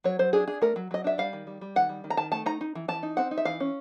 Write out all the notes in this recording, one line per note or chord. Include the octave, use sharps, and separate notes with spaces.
F#3 C#5
F#3 C5
D4 G#4
D4 G#4
A3 A#4
F#3
F#3 D#5
D4 E5
G3 F5
D#3
G3
G3
D#3 F#5
G3
D#3
A#5
D#3 A5
A3 A5
D#4 A#5
D#4
E3
E3 A5
D#4
C4 F#5
D#4
E5
E3 F5
C#4